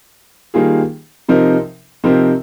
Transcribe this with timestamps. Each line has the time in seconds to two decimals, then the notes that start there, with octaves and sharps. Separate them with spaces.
0.54 D#3 G3 A#3 F4 G#4
1.29 C3 F3 C4 D#4 A#4
2.04 C3 F3 C4 D#4 A#4